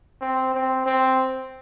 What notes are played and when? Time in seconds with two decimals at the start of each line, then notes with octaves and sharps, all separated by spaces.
0.21 C4
0.54 C4
0.86 C4